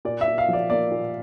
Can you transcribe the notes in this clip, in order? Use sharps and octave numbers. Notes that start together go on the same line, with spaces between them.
A#2 D5
E5
A#2
F5
F3 D5
A#3 D5
A#2